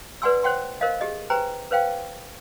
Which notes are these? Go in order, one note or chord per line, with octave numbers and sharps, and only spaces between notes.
B4 D5 F#5 G#5 C6 E6
C5 C#5 F#5 G5 C6
A#4 C5 D#5 F5
G4 G#4 D#5
G4 B4 C5 G5 G#5 A#5
B4 C5 F5 G5